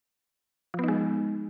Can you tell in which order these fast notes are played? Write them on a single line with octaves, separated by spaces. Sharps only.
F3 B3 D#4 G#3